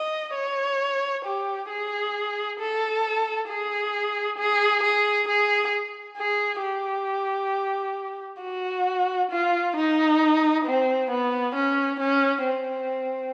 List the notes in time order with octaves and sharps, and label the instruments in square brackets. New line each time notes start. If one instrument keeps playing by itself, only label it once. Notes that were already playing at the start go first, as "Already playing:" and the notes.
Already playing: [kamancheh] D#5
C#5
G4
G#4
A4
G#4
G#4
G#4
G#4
G#4
G4
F#4
F4
D#4
C4
B3
C#4
C#4
C4